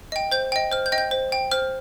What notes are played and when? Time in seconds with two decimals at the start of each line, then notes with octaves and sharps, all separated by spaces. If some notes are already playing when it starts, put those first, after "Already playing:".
0.12 D#5 G5
0.32 C5 G6
0.52 D#5 G5
0.72 C5 F6
0.86 G6
0.92 D#5 G5
0.98 G6
1.11 C5
1.32 G5
1.51 C5 F6